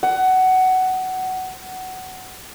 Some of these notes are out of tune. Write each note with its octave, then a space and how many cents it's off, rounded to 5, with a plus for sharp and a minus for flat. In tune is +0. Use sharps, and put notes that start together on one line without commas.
F#5 +15